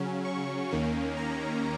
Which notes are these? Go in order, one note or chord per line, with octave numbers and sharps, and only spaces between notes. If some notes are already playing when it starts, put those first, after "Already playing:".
Already playing: C#3 F#3 C#4
C#6
D#2 D#3 A#3 C#4
A#5